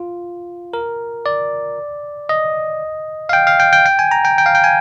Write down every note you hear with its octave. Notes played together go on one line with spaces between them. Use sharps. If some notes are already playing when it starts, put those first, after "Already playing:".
Already playing: F4
A#4
D5
D#5
F5
G5
F5
G5
G5
G5
G#5
A#5
G5
G5
F5
G5
G#5